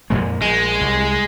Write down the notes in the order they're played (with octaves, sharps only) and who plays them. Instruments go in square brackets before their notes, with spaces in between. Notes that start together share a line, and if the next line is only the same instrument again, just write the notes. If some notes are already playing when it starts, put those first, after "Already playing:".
[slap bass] F2 A#2 G#3
[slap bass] A#1 [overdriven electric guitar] G#3
[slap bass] C2